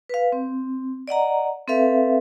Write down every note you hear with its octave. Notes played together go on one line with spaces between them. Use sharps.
B4 F5
C4
D5 D#5 F#5 A#5
C4 A4 B4 E5 F5